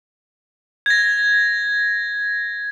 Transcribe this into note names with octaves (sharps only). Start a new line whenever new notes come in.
G#6 A#6